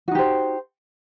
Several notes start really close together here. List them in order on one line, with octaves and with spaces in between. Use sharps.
F#4 D#4 G4 C5